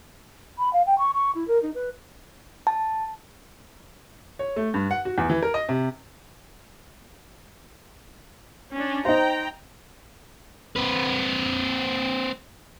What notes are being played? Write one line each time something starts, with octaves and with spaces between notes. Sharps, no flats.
B5
F5
G5
C#6
C#6
E4
A#4
D#4
B4
A5
C#5
A3
G2
F#5
F#4
E2
E3
A#4
D#5
C3
C#4 D4
D#4 C5 G5 A#5
C4 B4